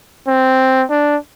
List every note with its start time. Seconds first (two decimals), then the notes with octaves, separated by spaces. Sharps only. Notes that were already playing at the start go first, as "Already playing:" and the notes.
0.28 C4
0.90 D4